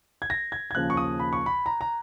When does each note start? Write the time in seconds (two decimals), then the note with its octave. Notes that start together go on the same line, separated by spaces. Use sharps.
0.22 G#6
0.30 A#6
0.52 G#6
0.71 G#6
0.74 D#2 C#3 F3 F#6
0.90 C#6
0.97 D#6
1.20 B5
1.33 C#6
1.46 B5
1.66 A#5
1.81 A#5